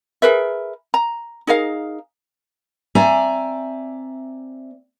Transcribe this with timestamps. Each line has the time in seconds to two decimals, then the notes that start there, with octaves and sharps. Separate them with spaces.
0.22 G#4 A#4 B4 E5
0.94 A#5
1.47 D#4 G#4 A#4 F5
2.95 C4 D5 E5 G#5 A#5